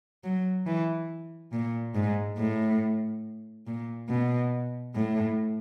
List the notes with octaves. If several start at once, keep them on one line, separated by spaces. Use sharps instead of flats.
F#3
E3
A#2
G#2
A2
A#2
B2
A2